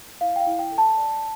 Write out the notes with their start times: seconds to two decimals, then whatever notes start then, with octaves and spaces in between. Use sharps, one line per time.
0.21 E4 F5
0.36 G5
0.40 F5
0.47 E4
0.59 G5
0.72 A4
0.78 A5
0.97 D5